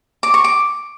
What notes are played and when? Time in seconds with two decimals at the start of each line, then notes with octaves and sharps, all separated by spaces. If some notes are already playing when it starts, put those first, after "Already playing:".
0.23 D6
0.34 C#6
0.44 D6